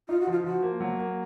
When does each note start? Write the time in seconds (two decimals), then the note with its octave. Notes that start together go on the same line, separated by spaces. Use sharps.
0.09 D#4 F4
0.20 F#4
0.27 F3 F4
0.44 F3 F#4
0.63 A#3
0.81 F#3
0.99 A#3